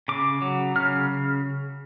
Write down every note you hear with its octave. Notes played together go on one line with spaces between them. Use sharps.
C#3 D6
F#3
C#3 F6